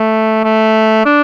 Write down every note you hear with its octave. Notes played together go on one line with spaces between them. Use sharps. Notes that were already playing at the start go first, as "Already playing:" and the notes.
Already playing: A3
A3
D4